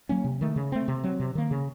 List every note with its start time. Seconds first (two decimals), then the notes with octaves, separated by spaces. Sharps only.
0.09 F#3 A#3 C#4
0.24 C3
0.41 D#3 A3
0.56 C#3
0.72 A3 C4
0.88 C3
1.04 F#3 C4
1.20 C3
1.35 D#3 A#3
1.51 C#3